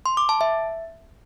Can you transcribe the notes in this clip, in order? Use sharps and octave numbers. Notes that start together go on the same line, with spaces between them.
C6
D6
A5
E5